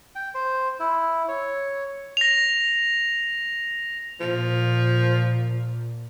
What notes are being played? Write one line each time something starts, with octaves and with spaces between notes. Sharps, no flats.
G5
C5
E4
C#5
A#6 F7
A#2 F3